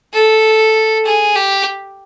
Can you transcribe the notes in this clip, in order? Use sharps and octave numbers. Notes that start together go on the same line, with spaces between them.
A4
G#4
G4